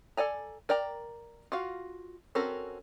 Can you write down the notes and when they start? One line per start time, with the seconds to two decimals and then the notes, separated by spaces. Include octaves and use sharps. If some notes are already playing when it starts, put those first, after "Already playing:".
0.17 A4 D5 G#5 A#5
0.69 A#4 D5 G5 A#5
1.52 F4 F#4 F5
2.35 C4 C#4 F#4 A4 A#4